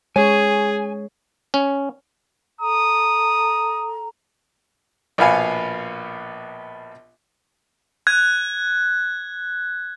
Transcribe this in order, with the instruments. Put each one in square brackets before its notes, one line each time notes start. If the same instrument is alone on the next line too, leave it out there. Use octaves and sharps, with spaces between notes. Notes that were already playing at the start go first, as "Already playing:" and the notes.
[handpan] G#3 C#5 [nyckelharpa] G#4 [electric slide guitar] G#5
[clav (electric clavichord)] C#4
[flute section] A4 A#5 [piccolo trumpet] D#6
[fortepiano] A#1 B2 B3 F5 G#5
[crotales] F#6 G#6